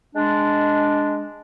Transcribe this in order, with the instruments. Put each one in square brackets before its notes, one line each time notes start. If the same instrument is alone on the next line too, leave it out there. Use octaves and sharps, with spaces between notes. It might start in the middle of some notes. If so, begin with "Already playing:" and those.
[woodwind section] G#3 D4